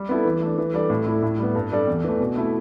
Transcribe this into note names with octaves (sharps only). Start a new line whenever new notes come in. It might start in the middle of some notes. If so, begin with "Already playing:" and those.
Already playing: G3
B3 E4 A4
E3
A3 D4
E3
G3 D4 A4 D5
A2
A3 E4
A2
G3 B3
G2
G3 D4 A4 D5
E2
E3 A3
B2
A3 E4